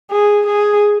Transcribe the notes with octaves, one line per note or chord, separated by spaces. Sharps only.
G#4
G#4